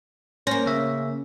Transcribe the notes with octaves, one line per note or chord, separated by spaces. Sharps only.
A#3 C#4 C5 A#6
C#3 E5